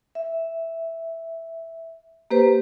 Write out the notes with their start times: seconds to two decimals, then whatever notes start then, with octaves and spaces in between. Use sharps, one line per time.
0.15 E5
2.31 A#3 G4 B4 C5